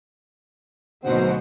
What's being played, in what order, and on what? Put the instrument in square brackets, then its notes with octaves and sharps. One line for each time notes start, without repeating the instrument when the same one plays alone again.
[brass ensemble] D2 G#2 [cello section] B2 F#3 C4 [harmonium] C5 F#5